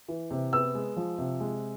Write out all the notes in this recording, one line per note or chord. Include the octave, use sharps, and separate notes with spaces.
E3
C3
B3 E6
G#3
F3
C3
G#3